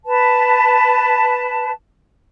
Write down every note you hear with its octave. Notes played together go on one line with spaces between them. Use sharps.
B4 A5